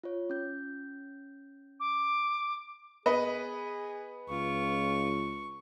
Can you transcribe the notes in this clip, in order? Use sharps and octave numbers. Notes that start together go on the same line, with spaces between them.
F4 C#5
C#4 G6
D6
B3 G#4 B4 D#5
C#2 F4 C#6